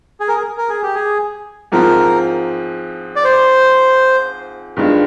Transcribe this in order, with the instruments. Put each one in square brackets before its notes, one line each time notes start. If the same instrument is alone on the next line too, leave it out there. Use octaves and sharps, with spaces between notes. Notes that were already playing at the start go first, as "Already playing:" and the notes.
[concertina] G#4
A#4
G#4
A#4
G#4
G4
G#4
[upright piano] G#2 F3 C4 F4 [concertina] A#4
[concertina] D5
C5
[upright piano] G2 D#3 G#3 D4 F4